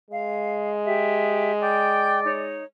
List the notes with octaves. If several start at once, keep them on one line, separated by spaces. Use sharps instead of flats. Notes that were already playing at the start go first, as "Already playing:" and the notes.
G#3 F5
G4 E5
D5 G5 G6
D#4 C#5